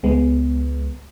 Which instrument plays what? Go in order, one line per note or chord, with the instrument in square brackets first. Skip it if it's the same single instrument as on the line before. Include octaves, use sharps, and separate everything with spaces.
[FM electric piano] C#2 G#3 B3